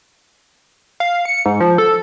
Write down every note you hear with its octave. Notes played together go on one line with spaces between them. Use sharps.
F5
C#7
G#2
F3
A4